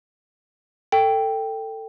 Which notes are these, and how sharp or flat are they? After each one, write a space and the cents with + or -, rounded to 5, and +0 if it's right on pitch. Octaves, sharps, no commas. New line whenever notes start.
A4 +20 G5 +0